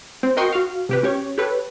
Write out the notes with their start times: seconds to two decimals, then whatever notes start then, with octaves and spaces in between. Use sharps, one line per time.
0.23 C4
0.37 F#4 A#4 D#5 G5 C6 C#6
0.52 F#4 F5
0.89 C3 G4 B4
1.03 C#4 G4 C#5
1.38 G4 A4 B4 C#5